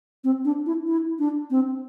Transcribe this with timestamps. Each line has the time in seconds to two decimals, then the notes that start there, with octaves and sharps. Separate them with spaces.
0.24 C4
0.45 D4
0.66 E4
0.87 E4
1.19 D4
1.50 C4